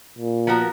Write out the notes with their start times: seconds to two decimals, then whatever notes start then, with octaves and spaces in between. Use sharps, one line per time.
0.18 A#2
0.47 F3 B3 F#4 A#4